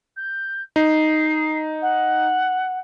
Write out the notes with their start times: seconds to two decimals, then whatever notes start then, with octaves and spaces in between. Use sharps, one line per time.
0.16 G6
0.76 D#4 C7
1.81 F#5